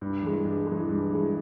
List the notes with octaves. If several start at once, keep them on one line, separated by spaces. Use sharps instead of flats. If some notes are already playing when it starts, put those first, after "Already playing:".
G2
E3 G#3
G2
E3 G#3
G2
E3 G#3